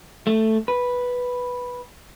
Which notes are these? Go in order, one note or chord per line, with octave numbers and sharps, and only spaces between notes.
A3
B4